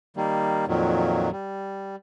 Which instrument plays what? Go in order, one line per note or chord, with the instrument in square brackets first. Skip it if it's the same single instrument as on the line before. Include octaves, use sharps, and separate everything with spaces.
[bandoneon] D#3 G3 A#3
F2 A#2 D#3 F#3
G3